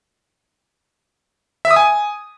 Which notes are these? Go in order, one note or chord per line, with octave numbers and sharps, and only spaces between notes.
E5
D#6
G#5